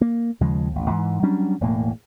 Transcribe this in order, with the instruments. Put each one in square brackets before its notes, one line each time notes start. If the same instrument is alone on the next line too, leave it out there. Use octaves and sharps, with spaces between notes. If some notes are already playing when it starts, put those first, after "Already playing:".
[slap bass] A#3
D#2 C#3 F3 G#3
A1 D#2
G#2 E3
F#3 G3 C#4 D4
E1 A2 A#3